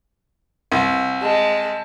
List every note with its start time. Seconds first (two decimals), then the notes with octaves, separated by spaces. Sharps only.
0.72 C2
1.22 G#3 A5